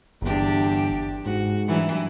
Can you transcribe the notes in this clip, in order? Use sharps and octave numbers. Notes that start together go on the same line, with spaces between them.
G1 E2 D4 G4
G#2 F#4
G2 E3 F#3